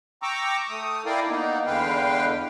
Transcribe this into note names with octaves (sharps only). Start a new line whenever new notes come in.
G5 A#5 C#6 D6 E6
A3 D#6
E4 A#4 D5 F5 G5
A#3 B3 D#4
E2 D3 G#3 B4 F5 G5